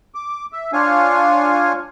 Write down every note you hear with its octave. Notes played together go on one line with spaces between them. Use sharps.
D6
E5
D4 F4 C#5 F5 G#5